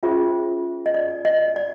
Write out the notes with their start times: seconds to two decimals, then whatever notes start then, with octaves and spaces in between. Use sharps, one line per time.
0.03 C#4 F4 G#4 C5 E5
0.86 D#5
0.94 D5
1.25 D#5
1.56 D5